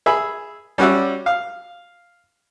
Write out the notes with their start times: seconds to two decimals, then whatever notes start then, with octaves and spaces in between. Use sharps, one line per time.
0.06 G#4 E5 B5
0.78 G3 C#4 F#4 D5 E5
1.26 F5